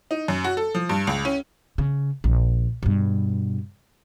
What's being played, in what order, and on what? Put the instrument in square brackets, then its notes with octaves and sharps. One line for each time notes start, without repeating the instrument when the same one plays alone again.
[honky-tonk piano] D#4
F#2
F#4
A4
F3
G2
C#2
C#4
[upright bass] C#3
A#1
G2 B2